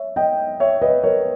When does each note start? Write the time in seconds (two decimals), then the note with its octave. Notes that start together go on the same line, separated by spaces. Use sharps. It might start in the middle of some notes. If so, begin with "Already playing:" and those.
Already playing: C#5 E5
0.16 D#5 G5
0.60 C#5 E5
0.82 B4 D#5
1.04 A#4 C#5